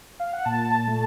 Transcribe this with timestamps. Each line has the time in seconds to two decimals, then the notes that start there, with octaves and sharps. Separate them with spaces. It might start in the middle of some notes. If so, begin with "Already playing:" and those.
0.20 F5
0.33 F#5
0.45 A#2 A5
0.87 A3